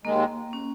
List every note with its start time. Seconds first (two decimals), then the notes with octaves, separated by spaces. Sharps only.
0.05 D#2 D#3 G#3 A#3
0.53 C#4